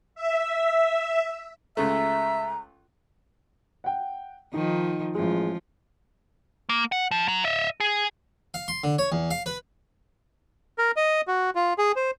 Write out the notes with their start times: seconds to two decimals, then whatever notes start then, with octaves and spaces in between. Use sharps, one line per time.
0.15 E5
1.77 C#2 C#3 A3 E5 A#5
3.84 F#5 G5
4.53 D#3 F3 D#4
5.15 A1 F3 G#3
6.69 A#3
6.92 F#5
7.11 F3
7.28 F#3
7.44 D#5 E5
7.80 G#4
8.54 F5
8.68 C6
8.84 D3
8.99 C#5
9.12 E2
9.31 F5
9.46 B4
10.78 A#4
10.96 D#5
11.28 F#4
11.55 F4
11.78 G#4
11.96 C5